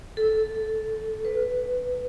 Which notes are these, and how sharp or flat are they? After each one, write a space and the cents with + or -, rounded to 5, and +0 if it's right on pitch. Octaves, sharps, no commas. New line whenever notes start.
A4 -10
B4 +10